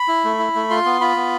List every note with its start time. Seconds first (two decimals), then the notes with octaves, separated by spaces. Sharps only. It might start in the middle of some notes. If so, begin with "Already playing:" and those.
Already playing: B5
0.08 E4
0.24 A3
0.39 E4
0.55 A3
0.70 F4 C6
0.86 B3
1.01 F4 B5
1.16 B3